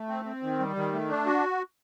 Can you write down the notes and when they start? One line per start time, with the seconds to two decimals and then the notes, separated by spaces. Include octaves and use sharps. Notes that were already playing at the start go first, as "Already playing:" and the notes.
Already playing: A3
0.09 C4
0.25 C4
0.43 D#3
0.59 G3
0.76 D#3
0.93 A3
1.10 D4
1.26 F#4